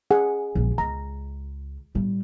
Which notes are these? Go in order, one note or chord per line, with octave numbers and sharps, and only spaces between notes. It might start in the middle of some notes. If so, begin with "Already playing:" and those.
G#4 F#5
A#1 G#3
C#2 A#5
A2 G3